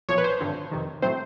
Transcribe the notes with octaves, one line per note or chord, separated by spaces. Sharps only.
B1 A#2 F3 C#5
B4
C5
G#1 G2 D3
F2 C3 D#3
A2 F#3 A3 C4 C5